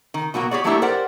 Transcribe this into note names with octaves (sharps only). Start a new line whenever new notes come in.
D#3
B2 F#3 A#3 F#4
G4 G#4 C#5 D5
F#3 A3 A#3 D4 E4 G4
G4 A#4 C5 D5 F#5